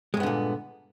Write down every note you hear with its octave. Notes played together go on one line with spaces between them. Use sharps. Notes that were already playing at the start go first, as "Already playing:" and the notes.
G2 A#2 D3 G#3 B3